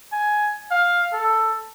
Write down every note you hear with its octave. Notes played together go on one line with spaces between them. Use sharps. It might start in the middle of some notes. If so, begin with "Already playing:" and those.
G#5
F5
A4